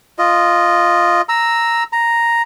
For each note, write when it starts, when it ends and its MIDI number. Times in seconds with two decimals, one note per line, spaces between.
0.19 1.21 65
0.19 1.21 75
1.29 1.83 82
1.29 1.83 88
1.93 2.42 82